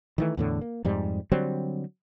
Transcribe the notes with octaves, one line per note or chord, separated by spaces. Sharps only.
D#3 E3 A3
E2 A2 D3
A#3
F2 G#2 G3
D3 F#3 G3 C4